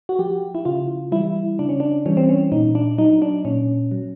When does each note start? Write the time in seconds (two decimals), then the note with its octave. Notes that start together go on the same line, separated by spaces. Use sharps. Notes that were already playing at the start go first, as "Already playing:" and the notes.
0.09 F#4
0.19 F3 G4
0.55 E4
0.65 C#3 F4
1.12 E3 G3 E4
1.59 C#3 D4
1.69 C#4
1.80 D4
2.06 E3 G3 C#4
2.17 C4
2.29 C#4
2.52 A#2 D#4
2.75 D4
2.98 F#3 D#4
3.22 D4
3.45 A#2 C#4
3.91 F#3